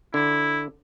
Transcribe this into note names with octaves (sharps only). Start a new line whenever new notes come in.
D3 E4